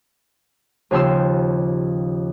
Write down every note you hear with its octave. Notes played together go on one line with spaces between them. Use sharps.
D#2 C#3 F3 G4 C6 E6